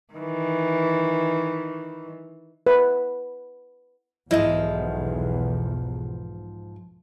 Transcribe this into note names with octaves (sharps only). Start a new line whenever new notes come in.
D#3 E3
B4
B1 E2 G#2 F3 E4 D#5